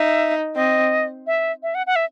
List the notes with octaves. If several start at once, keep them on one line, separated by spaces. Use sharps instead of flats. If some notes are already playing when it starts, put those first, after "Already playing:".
Already playing: D#4 E5
C4 D#5
E5
E5
F#5
F#5
E5